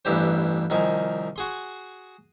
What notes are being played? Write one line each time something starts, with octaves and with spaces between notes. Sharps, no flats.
A1 G2 E3 G4 C5
C2 D#3 F3 G#5
F#4 G#4 C6